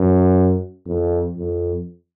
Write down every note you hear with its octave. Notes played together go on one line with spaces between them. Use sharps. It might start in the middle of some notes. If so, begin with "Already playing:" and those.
Already playing: F#2
F2
F2